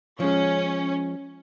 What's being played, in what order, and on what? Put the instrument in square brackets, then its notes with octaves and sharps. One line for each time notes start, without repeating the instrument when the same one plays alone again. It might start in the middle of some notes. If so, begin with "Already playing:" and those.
[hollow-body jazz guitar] F3 G#3 [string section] C#4